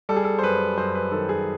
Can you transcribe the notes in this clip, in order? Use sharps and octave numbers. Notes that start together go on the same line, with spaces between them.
G3 A4
G#4
A4
C5
F#2 B4
F#2 C5
B4
D#3 A4
G#4